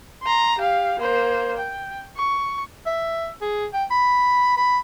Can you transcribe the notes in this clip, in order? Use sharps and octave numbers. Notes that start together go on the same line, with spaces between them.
A#5 C6
G4 F5
A#3 C5
G5
C#6
E5
G#4
G5
B5
B5